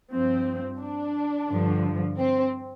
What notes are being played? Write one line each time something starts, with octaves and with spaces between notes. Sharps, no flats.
G2 F3 C4
D4
G2 D3 F3
C4